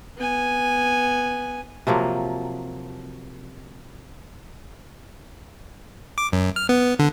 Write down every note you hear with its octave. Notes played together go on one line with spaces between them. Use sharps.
B3 G#5
C3 F3 F#3 A#3
D6
F#2
F6
B3
D3